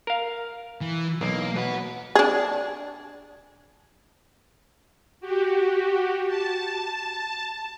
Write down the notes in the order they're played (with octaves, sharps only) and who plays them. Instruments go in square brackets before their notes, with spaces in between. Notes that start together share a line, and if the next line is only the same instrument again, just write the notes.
[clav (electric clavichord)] A#4 F5
[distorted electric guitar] E3
[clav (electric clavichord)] B1 [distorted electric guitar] A#3
[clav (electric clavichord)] B2 [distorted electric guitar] B4 F#5
[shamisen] D4 G#4
[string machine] F#4 G4
A5